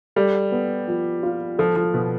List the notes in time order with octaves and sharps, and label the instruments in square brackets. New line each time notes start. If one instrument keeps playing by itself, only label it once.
[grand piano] G3 [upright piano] A4
[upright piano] B3
F3
F4
[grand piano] F3 [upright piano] A4
[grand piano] F3
[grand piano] B2 [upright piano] B3